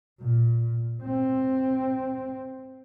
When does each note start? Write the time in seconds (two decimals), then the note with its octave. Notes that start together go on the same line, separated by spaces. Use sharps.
0.20 A#2
1.03 C4